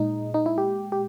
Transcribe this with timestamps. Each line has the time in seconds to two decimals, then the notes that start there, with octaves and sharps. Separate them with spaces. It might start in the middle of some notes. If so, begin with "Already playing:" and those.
Already playing: A#2 G#3 D#4
0.34 D#4
0.46 E4
0.58 G4
0.92 G4